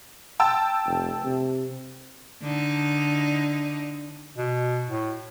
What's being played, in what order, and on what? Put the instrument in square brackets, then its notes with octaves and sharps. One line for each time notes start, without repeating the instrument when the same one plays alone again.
[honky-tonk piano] G5 A5 E6
[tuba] F1
C3
[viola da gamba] D3 D#4
[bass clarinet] B2
A2